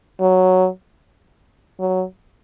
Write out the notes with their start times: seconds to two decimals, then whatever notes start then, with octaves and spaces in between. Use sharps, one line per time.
0.20 F#3
1.79 F#3